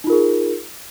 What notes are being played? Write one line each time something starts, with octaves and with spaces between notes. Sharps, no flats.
D#4 F4 G#4 A#4